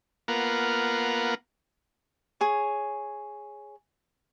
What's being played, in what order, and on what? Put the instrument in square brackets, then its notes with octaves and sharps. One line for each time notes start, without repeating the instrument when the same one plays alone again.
[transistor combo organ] A#3 B3 F4 A#4 F#5
[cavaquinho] G#4 C#5